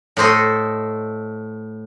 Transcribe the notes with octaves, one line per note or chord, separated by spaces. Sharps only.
A2 A4 C5 D#5